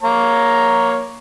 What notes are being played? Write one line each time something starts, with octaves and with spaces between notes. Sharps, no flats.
A#3 C#5 A#5